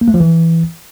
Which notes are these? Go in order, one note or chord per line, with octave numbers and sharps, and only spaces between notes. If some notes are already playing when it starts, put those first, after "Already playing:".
A#3
A3
F3
E3